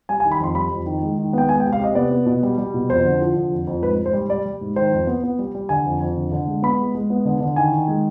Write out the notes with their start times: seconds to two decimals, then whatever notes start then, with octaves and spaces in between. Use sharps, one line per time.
0.09 G3 G#5
0.20 G#5
0.25 D#3
0.31 B5
0.40 F2 C6
0.55 G3 B5
0.71 F2
0.86 D#3
1.03 G#3
1.18 D#3
1.33 B3 G5
1.49 G#3 G#5
1.60 G5
1.65 C3
1.72 F5
1.80 C3 D#5
1.95 B3 D5
2.11 B3
2.26 B2
2.43 G3
2.58 G3
2.74 B2
2.89 F2 C5
3.05 D3
3.21 F3
3.36 D3
3.51 F2
3.67 F2
3.82 G#2 B4
3.98 G#2
4.06 C5
4.13 G3
4.29 G3 D5
4.46 G3
4.61 G#2
4.76 D#3 C5
4.92 F2
5.07 B3
5.23 B3
5.39 G3
5.55 G3
5.69 D3 G#5
5.85 F2
6.00 F2
6.16 D3
6.32 D3
6.47 G#3
6.63 B3 B5
6.79 G#3
6.95 G#3
7.10 B3
7.25 D3
7.40 D3
7.56 D#3 G#5
7.72 D#3
7.88 G#3